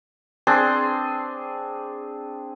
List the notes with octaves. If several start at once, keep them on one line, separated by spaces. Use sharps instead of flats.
C4 D4 G#4 C6